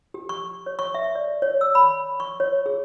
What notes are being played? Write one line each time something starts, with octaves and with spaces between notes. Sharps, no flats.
G4
C#6
C#5
C#6
E5
D5
C#5
E6
B5
C#6
C#5
G#4